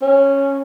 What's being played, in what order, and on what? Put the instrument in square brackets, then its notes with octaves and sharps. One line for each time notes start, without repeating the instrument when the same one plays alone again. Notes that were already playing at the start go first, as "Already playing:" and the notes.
[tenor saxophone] C#4